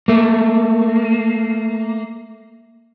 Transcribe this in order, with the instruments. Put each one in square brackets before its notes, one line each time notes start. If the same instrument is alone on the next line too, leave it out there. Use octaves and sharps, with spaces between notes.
[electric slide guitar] A3 A#3